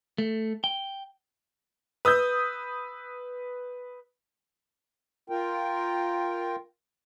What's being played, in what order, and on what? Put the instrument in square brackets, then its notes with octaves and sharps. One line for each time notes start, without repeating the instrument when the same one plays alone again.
[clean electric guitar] A3
G5
[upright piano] B4 D#6 E6 G6
[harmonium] F4 A#4 G5